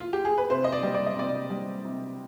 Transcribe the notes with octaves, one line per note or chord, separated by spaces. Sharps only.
F4
G4
G#4
B4
C3 C5
D#5
D5
G3
D5
D#5
C3 D5
G3
C3